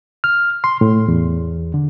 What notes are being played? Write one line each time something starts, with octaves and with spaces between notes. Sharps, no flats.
F6
C6
A2
E2
D3